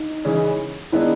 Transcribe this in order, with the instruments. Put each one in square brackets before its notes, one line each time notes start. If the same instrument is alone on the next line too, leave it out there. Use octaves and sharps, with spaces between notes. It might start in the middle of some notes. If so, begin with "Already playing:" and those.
Already playing: [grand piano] D#4
[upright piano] C#3 E3 G#3 C#4
[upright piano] D#3 G#3 B3 D4 [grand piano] E4